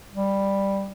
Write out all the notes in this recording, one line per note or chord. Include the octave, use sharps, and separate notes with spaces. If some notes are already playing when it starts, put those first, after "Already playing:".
G3